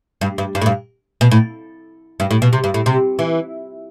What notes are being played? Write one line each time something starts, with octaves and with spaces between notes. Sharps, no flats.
G2
G2
G2
A2
G2
B2
A2
G2
A2
B2
C3
G2
A2
C3
E3